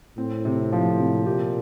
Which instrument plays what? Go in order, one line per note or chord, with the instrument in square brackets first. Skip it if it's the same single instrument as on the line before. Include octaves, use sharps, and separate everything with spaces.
[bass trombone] A2 [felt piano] C4
[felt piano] C3
F3
C3
[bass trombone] A#2 [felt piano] G4